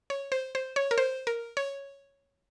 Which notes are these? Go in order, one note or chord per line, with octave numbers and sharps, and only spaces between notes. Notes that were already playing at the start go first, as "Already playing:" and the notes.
C#5
C5
C5
C#5
A#4
C5
A#4
C#5